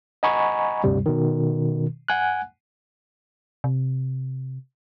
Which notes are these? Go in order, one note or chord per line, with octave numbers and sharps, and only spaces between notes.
D#5 F#5 G#5 A#5 B5 C#6
D2 G2 C3 G3
B2 D#3
F#5 G#5 F#6
C3